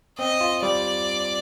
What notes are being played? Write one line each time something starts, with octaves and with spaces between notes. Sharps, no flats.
C4 D#5
F4
G3 D5